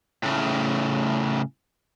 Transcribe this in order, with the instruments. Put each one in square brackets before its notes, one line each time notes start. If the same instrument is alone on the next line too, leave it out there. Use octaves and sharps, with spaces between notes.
[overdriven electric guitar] A2 C#3